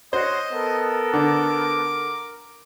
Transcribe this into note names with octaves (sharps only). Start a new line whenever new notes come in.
F#4 C5 C#5 D#5 C6
B3 A4 A#4
D3 D6